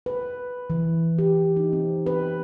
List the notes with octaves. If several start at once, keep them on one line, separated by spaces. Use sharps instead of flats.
B4
E3
G4
D#4
C4
B4